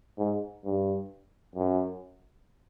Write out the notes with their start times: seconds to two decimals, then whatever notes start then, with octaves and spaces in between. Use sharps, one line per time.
0.18 G#2
0.65 G2
1.55 F#2